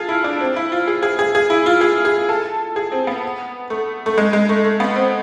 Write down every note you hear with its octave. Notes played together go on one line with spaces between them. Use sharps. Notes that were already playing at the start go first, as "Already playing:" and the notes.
Already playing: F4 G#4 A4
E4
D4
C4
E4
F4
G#4
G#4
G#4
G#4
E4
F4
G#4
G#4
A4
G#4
C4
B3
A3
A3
G#3
G#3
A3
A3
B3
C4